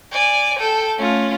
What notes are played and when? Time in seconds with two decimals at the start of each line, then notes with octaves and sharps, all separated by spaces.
0.12 D5 G#5
0.58 A4 G5
0.98 A3 C#4 F4